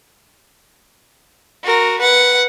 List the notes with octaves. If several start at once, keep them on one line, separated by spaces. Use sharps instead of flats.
F#4 A#4
B4 F#5